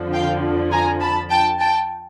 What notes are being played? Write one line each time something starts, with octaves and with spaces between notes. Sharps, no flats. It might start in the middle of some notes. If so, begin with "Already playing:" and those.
Already playing: F2 D3 F3
F5 G5
G#5 A#5
A5 B5
G5 A5
G5 A5